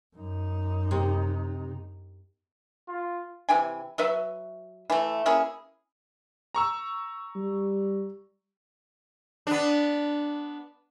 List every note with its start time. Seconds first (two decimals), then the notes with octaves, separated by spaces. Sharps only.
0.16 F#2 D#4
0.91 C3
2.88 F4
3.49 C3 E3 G5 G#5
3.98 F#3 B4 E5
4.90 E3 A3
5.26 A#3 C#4 E4 G#4
6.55 A#5 C#6 E6
7.35 G3
9.47 B3 D4